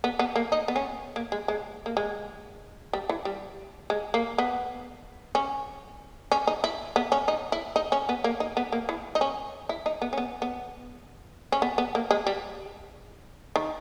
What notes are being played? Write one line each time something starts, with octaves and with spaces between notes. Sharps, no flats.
B3
B3
A#3
D#4
B3
C#4
A#3
G#3
G#3
A#3
G#3
G3
E3
G3
G#3
A#3
B3
C#4
C#4
D#4
E4
B3
C#4
D#4
E4
D#4
C#4
B3
A#3
D#4
B3
A#3
E3
D#4
C#4
E4
D#4
B3
C#4
B3
B3
C#4
B3
B3
A#3
G#3
G3
D#3